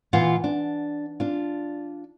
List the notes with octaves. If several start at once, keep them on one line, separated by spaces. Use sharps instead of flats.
A#2 E3 F4 F5 F#5
D4
D4 F4